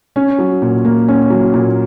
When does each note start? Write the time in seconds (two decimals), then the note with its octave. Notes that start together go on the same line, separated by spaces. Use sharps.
0.16 C#4
0.39 F#3
0.62 A#2
0.85 A#3
1.08 C#4
1.30 F#3
1.54 A#2